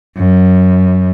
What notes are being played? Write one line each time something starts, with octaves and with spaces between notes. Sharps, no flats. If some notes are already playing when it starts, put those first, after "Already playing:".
F#2